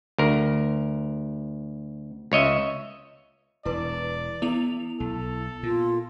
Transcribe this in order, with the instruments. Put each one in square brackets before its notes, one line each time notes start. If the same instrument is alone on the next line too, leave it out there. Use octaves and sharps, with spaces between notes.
[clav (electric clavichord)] D2 A#4
C#2 C#5 D#5 E5
[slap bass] E1 [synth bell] E4 B4 [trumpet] D5
[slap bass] E3 [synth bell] B3 E4 F7
[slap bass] B1 [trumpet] A4
[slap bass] A#2 [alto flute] F4